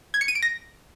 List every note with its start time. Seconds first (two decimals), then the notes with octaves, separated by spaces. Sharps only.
0.14 G#6
0.21 C#7
0.28 D#7
0.35 D7
0.42 A#6